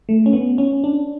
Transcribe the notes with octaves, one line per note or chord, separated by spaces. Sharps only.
A3
C#4
B3
C#4
D4